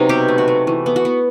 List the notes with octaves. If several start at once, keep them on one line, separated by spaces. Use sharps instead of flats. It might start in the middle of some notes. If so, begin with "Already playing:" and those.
Already playing: C3 F#3 B3 D#4
B2 G4
A3
F#4
A3
E3
B3
F#4
B3